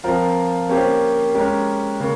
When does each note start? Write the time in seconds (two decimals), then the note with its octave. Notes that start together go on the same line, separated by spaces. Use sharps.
0.04 F3 C4 F4 A#4
0.69 A#3 C#4 G4 C5
1.34 G#3 C#4 G4 A#4
2.00 C#3 A#3